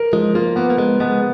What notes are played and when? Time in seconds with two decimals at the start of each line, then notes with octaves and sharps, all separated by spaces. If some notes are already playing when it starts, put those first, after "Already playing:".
Already playing: A#4
0.13 F3 G#3
0.35 A#3 F4
0.56 A#3 B3
0.70 A#3
0.78 G#3 B3
1.00 G#3 B3